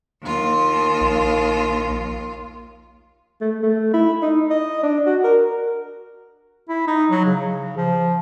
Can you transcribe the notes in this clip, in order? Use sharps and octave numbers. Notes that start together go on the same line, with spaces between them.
D#2 F4
A#1
A3
A3
E4
D#4
D#5
D4
F#4
A#4
E4
D#4
F#3
C#3
F3